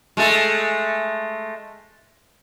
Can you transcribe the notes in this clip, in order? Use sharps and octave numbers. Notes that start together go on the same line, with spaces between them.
G#3 A3 A4